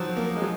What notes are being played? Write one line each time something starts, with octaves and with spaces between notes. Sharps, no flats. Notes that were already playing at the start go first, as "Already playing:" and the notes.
Already playing: D#3 F3 F#3
A#3
G#3
F#3